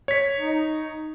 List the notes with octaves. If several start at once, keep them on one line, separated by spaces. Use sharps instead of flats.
C#5 B6
D#4